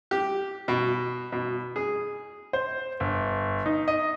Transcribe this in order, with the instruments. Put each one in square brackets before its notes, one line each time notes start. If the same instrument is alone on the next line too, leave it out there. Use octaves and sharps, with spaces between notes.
[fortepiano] G4
B2
B2
G#4
[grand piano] C5
G1
D#4
D#5